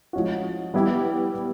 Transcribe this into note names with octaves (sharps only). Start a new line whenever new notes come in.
F3 G#3 C#4 F#4
G3 B3 E4 G4